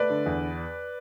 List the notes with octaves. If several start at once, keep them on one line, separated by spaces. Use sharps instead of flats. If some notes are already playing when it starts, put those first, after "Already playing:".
Already playing: A3 B4 D5
D3
E2